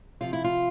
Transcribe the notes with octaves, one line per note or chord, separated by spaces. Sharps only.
C3 F3 F4
E4
F4